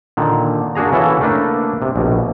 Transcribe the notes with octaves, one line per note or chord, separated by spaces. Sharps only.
A#2 D3 D#3
A#3 D4 F#4 G#4 A#5
C#3 E3 E4 F#4 A4
A3 A#3 D4 B4
C3
A#1 B2